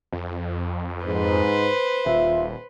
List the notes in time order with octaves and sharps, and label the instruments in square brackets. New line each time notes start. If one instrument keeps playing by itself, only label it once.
[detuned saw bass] F2
[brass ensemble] G#2 [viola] B4 C5
[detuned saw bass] D#1 [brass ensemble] F4 E5